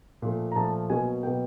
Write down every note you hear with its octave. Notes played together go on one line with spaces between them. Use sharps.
A#2 F3 A3
A#5
A#2 F3 A3 A5
B2 F#3 A#3 G#5
B2 F#3 A#3 G5